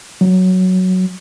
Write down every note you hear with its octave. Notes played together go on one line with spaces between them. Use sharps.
F#3